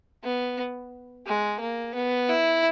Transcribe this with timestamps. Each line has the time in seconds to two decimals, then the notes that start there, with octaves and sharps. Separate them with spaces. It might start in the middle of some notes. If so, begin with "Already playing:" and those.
0.23 B3
1.26 G#3
1.60 A#3
1.95 B3
2.29 E4